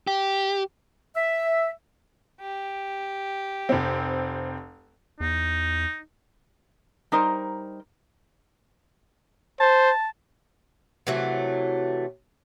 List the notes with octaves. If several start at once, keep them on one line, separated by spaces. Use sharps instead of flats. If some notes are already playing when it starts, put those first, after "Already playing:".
G4
E5
G4
F1 C4
E2 D#4
G3 D#4 A#4 C5
C5 A5
C3 E3 F#3 A3